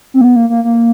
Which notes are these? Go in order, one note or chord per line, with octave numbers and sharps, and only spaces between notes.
C4
A#3
B3
A#3
A#3
A#3